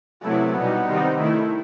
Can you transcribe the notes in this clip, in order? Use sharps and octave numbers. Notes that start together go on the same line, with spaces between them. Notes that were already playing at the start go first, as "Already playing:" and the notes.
C3 F#3 A3 B3 E4
B2 G3 B3 D#4
C3 D#3 G3 C4 D#4
D#3 A3 E4